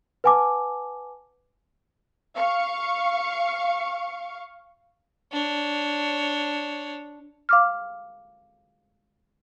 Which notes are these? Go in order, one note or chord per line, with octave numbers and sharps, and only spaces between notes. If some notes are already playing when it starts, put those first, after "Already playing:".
B4 F#5 G#5 A5 D6
F5 C#6
D4 C#5
F5 D6 F6